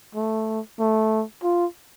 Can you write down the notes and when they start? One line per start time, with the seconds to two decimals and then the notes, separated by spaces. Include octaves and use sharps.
0.15 A3
0.79 A3
1.43 F4